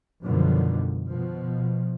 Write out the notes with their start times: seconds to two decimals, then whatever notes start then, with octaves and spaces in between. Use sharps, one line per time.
0.24 F#2 B2 D3 D#3 F3 G3
1.10 B2 F3